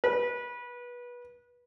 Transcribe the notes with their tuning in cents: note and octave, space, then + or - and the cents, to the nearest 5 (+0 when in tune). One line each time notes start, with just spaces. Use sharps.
B4 -25